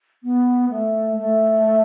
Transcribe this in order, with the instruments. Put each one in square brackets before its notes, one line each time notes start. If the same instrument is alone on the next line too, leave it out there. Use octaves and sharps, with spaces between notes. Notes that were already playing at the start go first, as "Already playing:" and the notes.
[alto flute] B3
A3
A3